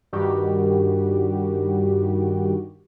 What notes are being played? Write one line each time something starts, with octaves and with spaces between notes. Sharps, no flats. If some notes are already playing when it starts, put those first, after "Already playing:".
G2 D#3 G3 F#4 G4